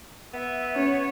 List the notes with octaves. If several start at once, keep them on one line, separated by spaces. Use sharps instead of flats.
B3 E5
C#4 C#5